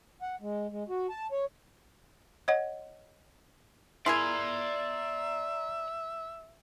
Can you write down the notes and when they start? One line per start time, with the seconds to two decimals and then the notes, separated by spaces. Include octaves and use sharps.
0.22 F#5
0.41 G#3
0.71 G#3
0.89 F#4
1.09 A5
1.32 C#5
2.48 C#5 D#5 F#5
4.06 E4 G#4 A#4 D5 E5 A#5 C6 G#6